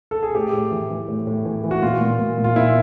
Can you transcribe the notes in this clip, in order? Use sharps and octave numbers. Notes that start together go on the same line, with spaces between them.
A4
G#4
A2 G4
A2
E3
E3
A2
A2
E3
E3
F#4
A#2 F4
A#2
A#2
A#2
F4
A#2 E4